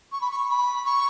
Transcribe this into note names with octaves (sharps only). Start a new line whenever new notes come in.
C#6
B5
C#6
B5
C#6